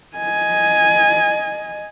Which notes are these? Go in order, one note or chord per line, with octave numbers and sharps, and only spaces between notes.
D#5 G#5